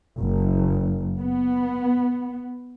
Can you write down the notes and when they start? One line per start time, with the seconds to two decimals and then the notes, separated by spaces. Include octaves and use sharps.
0.18 F#1
1.19 B3